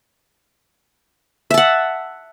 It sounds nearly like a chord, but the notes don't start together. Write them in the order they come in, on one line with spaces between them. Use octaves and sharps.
E5 A5 F#5